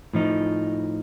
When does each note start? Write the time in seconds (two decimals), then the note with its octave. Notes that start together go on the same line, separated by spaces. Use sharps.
0.14 A2 F3 D#4